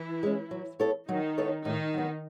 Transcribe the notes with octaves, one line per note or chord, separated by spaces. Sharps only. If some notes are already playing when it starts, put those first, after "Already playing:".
Already playing: E3 E4
G#3 C#4
F#3
B3 E4 A4 C#5
D#3 F#3 D#4
B3 E4 A4 C#5
A2 D#3 D#4
F#3 B3